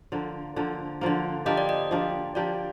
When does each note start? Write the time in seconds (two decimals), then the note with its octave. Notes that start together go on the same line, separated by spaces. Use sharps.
0.12 D3 F3 A#3
0.56 D3 F3 A#3
1.01 D3 F3 A#3
1.46 F3 A#3 D4 G4 D#5
1.58 D5
1.69 D#5
1.91 F3 A#3 D4 G4
2.35 F3 A#3 D4 G4 D5